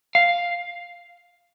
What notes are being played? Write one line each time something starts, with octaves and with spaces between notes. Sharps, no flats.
F5